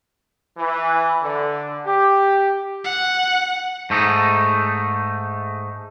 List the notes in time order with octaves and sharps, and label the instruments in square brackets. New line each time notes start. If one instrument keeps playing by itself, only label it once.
[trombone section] E3
D3
G4
[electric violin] F#5
[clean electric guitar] G#2 A3 D#4